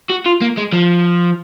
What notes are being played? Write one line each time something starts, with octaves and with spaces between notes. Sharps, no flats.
F#4
F4
A#3
G#3
F3